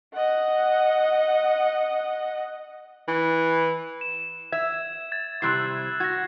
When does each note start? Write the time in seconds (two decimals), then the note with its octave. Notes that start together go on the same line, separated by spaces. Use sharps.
0.14 D#5 F#5
3.08 E3
4.01 E7
4.52 E5 G#6
5.12 G#6 A6
5.42 C3 G3 E4 E6 F#6 C7
6.00 F#4 G#6 A#6